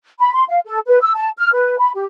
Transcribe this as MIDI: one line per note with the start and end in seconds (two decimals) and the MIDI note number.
0.20 0.31 83
0.34 0.44 84
0.49 0.60 77
0.65 0.79 69
0.87 0.97 71
1.02 1.12 88
1.16 1.29 81
1.38 1.49 89
1.54 1.78 71
1.79 1.90 83
1.95 2.04 67